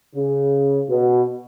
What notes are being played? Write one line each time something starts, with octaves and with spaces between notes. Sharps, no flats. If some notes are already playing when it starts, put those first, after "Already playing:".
C#3
B2